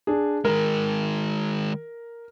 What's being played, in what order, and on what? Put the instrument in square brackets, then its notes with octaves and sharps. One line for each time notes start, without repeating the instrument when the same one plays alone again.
[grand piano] D4 G#4
[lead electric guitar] D#3 G#3 [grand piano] A#4